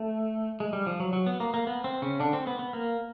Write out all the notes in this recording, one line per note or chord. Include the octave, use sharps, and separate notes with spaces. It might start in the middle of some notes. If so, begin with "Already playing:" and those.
Already playing: A3
G#3
G3
F3
F#3
F#3
B3
A#3
A#3
B3
C4
C#3 C#4
D3 D4
C4
B3
B3
A#3